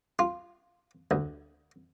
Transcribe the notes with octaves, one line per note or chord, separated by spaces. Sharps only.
F4
D2